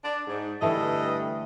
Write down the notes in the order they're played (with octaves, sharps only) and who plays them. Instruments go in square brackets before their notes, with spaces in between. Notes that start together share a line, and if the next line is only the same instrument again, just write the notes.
[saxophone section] D4
G#2
[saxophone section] G2 A4 D#5 [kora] D3 E3 A3